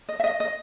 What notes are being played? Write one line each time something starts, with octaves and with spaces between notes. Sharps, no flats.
D#5
E5
D#5
D#5